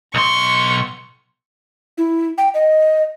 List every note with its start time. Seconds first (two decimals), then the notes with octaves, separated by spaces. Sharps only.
0.15 B1 C6 C#6
1.98 E4
2.38 G5
2.54 D#5